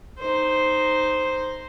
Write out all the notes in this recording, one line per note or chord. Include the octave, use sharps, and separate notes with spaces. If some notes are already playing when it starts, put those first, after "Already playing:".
D#4 C5